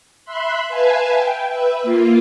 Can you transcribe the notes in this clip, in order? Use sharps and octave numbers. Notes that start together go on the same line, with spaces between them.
E5 B5 C6 F#6
B4 E5 F5 G#5 A5
G5
B4 E5
A#3 F4